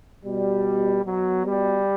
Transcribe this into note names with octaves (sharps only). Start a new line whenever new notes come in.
B2 G3
B2 F#3
G3